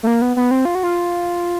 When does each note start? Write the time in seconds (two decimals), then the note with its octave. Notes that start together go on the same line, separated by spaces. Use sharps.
0.03 A3
0.07 A#3
0.22 B3
0.36 B3
0.51 C4
0.65 F4
0.75 F#4
0.83 F4